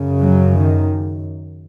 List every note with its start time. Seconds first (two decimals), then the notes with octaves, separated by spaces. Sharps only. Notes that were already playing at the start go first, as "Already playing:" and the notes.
Already playing: F#2 C#3
0.22 F#3
0.55 D#3